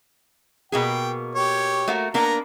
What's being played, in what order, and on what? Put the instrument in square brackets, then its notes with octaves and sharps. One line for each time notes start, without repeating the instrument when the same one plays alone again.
[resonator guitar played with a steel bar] B2 A#3 G#4 [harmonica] G5
[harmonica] G4 C#5
[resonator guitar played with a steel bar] A3 A#3 F#4
[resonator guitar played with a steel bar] A#3 B3 D4 [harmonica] A#4 A#5